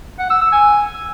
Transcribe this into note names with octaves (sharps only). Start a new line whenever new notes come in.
F#5
E6
E6
G#5